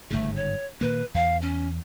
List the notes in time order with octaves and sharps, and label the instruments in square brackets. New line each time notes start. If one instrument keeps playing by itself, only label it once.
[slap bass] G1 G#2 C#3 [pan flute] A3
[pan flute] C#5
[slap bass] A#2 D#3 A#3 [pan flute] B4
[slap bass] E2 [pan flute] F5
[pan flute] C#4